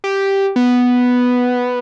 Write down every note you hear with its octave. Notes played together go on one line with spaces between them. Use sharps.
G4
B3